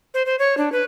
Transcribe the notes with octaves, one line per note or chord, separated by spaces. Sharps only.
C5
C5
C#5
D4
B4